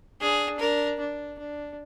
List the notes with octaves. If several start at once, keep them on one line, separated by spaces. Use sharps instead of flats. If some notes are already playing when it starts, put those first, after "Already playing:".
D4 G#4
D4 A#4
D4
D4